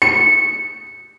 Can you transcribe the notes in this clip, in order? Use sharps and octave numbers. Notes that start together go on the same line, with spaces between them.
C#7